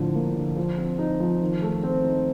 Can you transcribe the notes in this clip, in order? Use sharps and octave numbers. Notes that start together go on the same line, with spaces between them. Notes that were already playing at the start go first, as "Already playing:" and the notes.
Already playing: A2 D3 F3
A#3
D3
F3
C4
D#4
F3
D#3
A3
C4
D#4